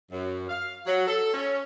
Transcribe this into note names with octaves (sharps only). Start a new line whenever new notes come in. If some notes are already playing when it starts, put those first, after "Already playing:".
F#2
F5
F#3
A4
C#4